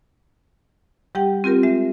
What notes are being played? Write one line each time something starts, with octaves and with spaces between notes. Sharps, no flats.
G3 G4 F#5 G5
C4 F4 G4 A#4
G#3 E5